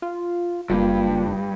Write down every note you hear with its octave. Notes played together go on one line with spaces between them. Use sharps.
F4
F#1 G2 A#3 F4